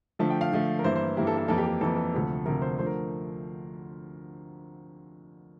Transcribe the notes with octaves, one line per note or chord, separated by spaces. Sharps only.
D3 F3 A3 A5
G5
F5
D3 F3 A3
A#4
G2 E3 A#3 E4 C5
C5
G2 E3 A#3 E4 G4
A4
A4
F2 E3 A#3 A4
G4
A4
F2 E3 A#3 A4
A4
D2 C3 F3 A3
D2 C3 F3 A3 A#4
C5
D3 F3 A3 C5
A#4